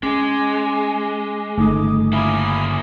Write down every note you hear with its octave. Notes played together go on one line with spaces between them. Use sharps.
G#3 C#4 G#5 D6
G1 C#3 A3 D#4 D6 D#6
A#3 E4 E5 G#5 B5 D6 D#6